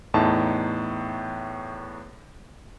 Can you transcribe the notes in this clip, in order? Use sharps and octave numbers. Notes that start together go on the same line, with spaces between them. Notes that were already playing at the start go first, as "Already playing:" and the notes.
E2 A2 D#4 A5